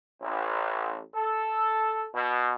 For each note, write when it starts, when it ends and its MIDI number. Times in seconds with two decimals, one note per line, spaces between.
0.22 0.99 33
1.14 2.06 69
2.14 2.55 47